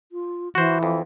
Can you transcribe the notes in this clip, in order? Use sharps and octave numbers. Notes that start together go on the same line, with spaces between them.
F4
E3 F#4 C5
F2